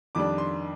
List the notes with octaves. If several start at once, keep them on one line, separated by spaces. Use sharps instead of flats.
F2 D#3 G3 D4 D6
C6